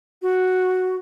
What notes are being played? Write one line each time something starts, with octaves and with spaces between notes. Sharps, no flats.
F#4